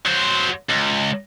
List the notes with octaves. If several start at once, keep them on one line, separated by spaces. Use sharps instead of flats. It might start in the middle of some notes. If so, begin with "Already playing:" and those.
F#3 C5
C#2